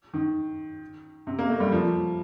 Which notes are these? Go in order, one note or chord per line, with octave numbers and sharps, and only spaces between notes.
D#3
C3
A#3
A3
G3
F3